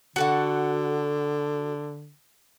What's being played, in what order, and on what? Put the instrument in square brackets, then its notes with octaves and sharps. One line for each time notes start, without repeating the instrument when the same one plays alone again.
[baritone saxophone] D3 [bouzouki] F#4 A4 F#5